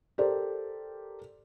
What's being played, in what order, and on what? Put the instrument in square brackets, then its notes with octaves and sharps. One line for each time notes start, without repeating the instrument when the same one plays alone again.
[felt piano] G4 A4 A#4 C5 D5